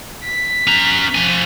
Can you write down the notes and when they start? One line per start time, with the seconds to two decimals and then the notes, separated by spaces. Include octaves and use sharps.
0.25 B6
0.67 C#4 A#5
1.15 F3 G#5